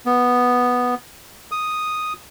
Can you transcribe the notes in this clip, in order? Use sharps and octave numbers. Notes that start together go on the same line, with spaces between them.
B3
D#6